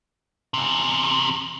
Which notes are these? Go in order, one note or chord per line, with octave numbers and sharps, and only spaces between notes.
E2 C3